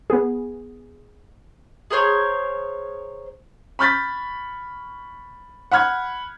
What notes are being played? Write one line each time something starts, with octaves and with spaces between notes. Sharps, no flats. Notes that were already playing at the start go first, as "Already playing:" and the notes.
B3 G#4
G#4 A#4 C5 C#5
B5 C#6 F6 G6 A6 B6
F#5 B5 F6 G#6